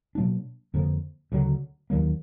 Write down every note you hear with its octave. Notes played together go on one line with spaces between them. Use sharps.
B2 F#3 A#3 D4
F2 D3 F3 A#3
D2 C#3 F#3
D#2 D#3 F#3 A#3